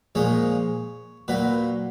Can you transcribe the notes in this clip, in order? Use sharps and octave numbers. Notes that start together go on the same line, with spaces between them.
A#2 F3 G#3 C#5
A#2 F#3 B4